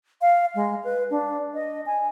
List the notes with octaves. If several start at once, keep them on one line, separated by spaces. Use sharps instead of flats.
F5
G#3
B4
D4
D#5
G#5